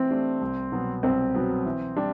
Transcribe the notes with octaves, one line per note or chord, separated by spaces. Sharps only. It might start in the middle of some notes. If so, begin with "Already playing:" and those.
Already playing: E3 A3 C4
A3 D4 G4
C2
B2 F#3 B3
C2 C4
B2 F#3 B3
E3
G3 D4 G4